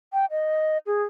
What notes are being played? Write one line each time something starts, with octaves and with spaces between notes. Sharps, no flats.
G5
D#5
G#4